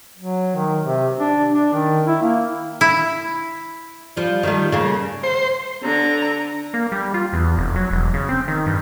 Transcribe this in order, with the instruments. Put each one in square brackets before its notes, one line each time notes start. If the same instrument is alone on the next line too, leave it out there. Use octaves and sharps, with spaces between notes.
[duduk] F#3
D#3
C3
D4
D4
D#3
E4
A#3
[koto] E4
[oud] F3 G3
D#3 G3 A3
C#3 A#3
[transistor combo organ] C5
[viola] D3 A#5
[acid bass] A#3
G3
F4
E2
F1
F#3
E1
C#3
C4
D#3
G2